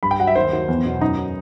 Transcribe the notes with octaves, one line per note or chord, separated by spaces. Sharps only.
G2 B5
G5
F#3 F#5
E5
D#2 C5
D#3 F#3
E2
B2 F#3
F#2 D#4
F#3